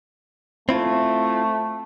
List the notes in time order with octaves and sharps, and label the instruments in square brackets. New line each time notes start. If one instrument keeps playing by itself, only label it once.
[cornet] A3 [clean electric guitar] C4 E4 F4